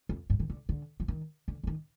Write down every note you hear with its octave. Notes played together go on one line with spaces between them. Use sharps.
F2
G2
D#3
D3
D3
F3
D#3
D3
F3
D#3